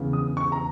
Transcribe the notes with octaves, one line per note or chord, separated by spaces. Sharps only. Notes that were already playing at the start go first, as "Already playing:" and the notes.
Already playing: E1 E2 C#3 E3
D#6
C#6
A#5